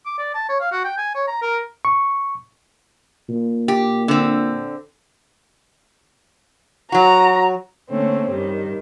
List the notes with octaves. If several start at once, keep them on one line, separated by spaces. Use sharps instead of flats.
D6
D5
A5
C#5
F5
F#4
G5
G#5
C#5
A#5
A#4
C#6
A#2
G4
D3 C4
F#3 F#4 A#5
D3 A3 A#3 C4 C#4
G2 D#3 G3